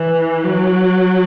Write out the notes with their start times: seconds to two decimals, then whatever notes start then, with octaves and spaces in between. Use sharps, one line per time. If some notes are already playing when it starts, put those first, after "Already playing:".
Already playing: E3
0.44 F#3